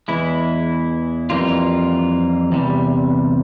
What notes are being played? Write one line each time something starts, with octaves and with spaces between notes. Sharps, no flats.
E2 E3 G#3 E4
F2 E3 G3 A#3 F4
E2 C3 G3